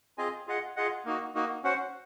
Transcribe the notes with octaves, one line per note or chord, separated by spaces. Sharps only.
C4 F4 G#4 D#5 G#5
F4 G#4 D#5 F#5
F4 G#4 D#5 F#5
A#3 D#4 F#4
A#3 D#4 F#4
C#4 F#4 C5 F#5